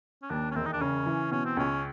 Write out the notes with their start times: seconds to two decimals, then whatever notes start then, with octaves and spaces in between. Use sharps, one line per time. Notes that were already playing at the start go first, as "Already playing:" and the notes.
0.23 C#4
0.30 D#2 D4
0.51 C#4
0.55 E1 C4
0.66 D#4
0.73 D4
0.81 C#3 C#4
1.06 E3
1.32 B2 C#4
1.45 C4
1.57 C#2 C#4